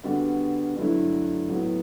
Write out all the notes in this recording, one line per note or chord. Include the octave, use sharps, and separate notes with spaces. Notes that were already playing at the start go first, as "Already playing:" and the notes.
D3 G3 B3 F#4
G2 D3 F#3 A3 E4
A2 F#3 B3 F#4